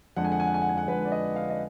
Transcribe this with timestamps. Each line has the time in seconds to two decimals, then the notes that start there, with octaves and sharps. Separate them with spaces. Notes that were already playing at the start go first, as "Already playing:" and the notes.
0.16 F2 D3 G#3 F#5
0.25 G#5
0.32 F#5
0.40 G#5
0.48 F#5
0.54 G#5
0.62 F#5
0.69 G#5
0.78 F#5
0.88 F2 D3 G#3 B4
1.05 D5
1.12 D#5
1.36 F5
1.50 D#5